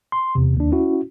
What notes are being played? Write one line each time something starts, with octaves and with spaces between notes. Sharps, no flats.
C6
E2 C3
D#2 D4
C#4 E4 F#4